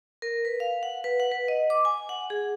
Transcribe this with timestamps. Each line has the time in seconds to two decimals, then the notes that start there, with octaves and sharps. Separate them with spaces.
0.22 A#4
0.45 B4
0.60 F5
0.83 F#5
1.04 B4
1.20 F#5
1.32 B4
1.48 D#5
1.70 D6
1.85 G#5
2.09 F#5
2.30 G#4